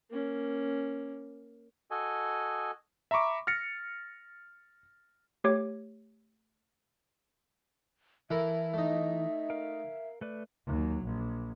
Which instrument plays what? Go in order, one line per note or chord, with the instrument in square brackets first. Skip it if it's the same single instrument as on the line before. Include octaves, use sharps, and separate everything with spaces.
[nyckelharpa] A#3 C#4
[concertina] F#4 A4 D#5 G#5
[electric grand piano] E5 A#5 B5 C#6 D6
F6 A6 A#6 C#7
[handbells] A3 G4 C#5 D6
[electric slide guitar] E3 [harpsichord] E4 A4 A#4 [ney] E5
[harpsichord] A3 D#4
[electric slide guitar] A#4 F5
A3 B4 D5
[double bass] D#2 F#3
A#1